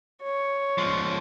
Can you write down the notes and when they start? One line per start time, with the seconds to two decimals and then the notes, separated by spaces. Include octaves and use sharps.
0.23 C#5
0.78 F3 G#3